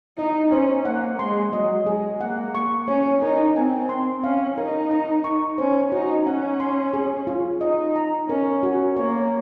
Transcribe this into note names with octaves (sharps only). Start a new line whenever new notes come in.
D#4 D#5
C#4 C5
A#3 F#5
G#3 C6
F#3 D#5
G#3 G#4
A#3 F#5
C#6
C#4 C#5
D#4 A#4
C4 G#5
C6
C#4 F5
D#4 A#4
A#5
C#6
C#4 C5
D#4 F#4
C#4 F#5
C6
G#4
F4
D#4 D#5
A#5
C#4 A#4
F#4
A#3 C#5